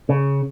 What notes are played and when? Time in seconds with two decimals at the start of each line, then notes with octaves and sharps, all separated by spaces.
0.09 C#3